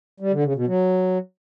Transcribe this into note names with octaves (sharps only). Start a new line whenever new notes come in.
G3
D3
C#3
B2
F#3